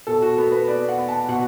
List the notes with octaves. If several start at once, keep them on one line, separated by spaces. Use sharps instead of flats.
B2 A4
F#4
B3 A4
B4
B3 D5
F#5
B3
A5
B2 F#5